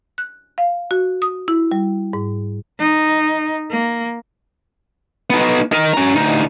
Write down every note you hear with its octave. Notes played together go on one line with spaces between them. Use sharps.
F#6
F5
F#4
D#6
E4
G3
G#2
D#4
A#3
B3 D#4
D#4 A#4
C#4 A#5
D2 D#4